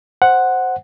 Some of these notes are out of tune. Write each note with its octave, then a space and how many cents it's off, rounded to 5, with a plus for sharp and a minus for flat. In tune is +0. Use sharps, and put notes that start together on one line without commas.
C5 +0 F#5 +0